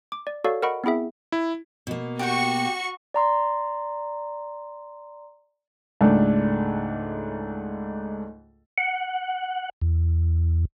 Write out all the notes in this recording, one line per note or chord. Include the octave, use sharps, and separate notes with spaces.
D6
D5
F#4 A4 C#5 D5 F5
A#4 D#5 F#5 B5 C#6 D7
B3 C4 E4 G#4 E5
E4
B2 A#3
F#4 G4 F#5 G5 C#6
D5 A#5 C6
C#2 G#2 A3 D4 A4
F#5
E2